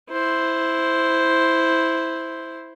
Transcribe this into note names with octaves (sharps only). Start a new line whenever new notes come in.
E4 C5